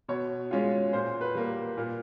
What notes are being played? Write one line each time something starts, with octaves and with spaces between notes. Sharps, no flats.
B2 C#5
G#3 C#4 F4
A#2 C5
B4
G3 A#3
A#2